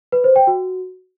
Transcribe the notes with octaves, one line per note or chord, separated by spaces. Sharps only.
B4
C5
G5
F#4